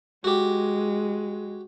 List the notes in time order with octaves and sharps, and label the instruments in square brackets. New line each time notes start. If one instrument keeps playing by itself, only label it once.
[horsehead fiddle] G#3 [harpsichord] F#4 G4